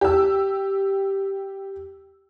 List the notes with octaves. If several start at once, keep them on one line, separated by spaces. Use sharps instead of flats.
G4 E6